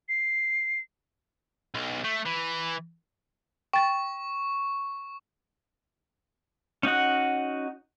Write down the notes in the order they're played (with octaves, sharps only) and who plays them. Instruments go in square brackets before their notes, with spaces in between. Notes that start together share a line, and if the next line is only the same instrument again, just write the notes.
[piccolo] C7
[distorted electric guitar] B1
A3
E3
[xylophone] G5 A6 [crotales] C#6
[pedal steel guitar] C#4 D#4 F#4 F#5